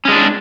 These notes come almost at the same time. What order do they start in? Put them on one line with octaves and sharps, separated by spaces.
C#4 G#3 D4